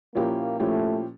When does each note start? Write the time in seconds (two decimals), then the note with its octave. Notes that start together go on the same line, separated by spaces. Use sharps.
0.15 A#2 F3 A#3 C#4 E4 G4
0.59 A#2 F3 A3 C#4 E4 G4